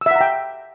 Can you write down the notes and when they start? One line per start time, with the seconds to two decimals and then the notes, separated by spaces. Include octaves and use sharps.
0.01 E6
0.06 E5
0.11 F#5
0.16 A#5
0.21 G5